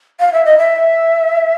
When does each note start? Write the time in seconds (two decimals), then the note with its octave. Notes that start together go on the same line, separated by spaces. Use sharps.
0.20 F5
0.33 E5
0.45 D#5
0.58 E5